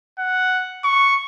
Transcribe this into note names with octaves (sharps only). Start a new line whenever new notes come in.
F#5
C#6